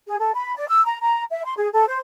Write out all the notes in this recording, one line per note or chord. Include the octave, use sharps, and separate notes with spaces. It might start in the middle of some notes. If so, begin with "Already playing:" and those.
G#4
A4
B5
D5
E6
A#5
A#5
E5
C6
G#4
A4
C5